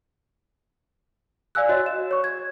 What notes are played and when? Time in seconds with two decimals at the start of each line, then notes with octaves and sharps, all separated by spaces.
1.55 D5 F5 G#5 E6 F#6
1.69 F#4 C#5 D#5
1.86 E7
2.11 C#5 C#6
2.24 G#6